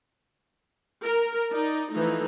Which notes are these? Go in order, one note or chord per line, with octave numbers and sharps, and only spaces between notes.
A#4
D#4 D5
E3 F3 A3 D#4